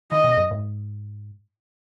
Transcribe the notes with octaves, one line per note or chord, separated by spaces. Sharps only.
D#3 D#5
B2
F#2
G#2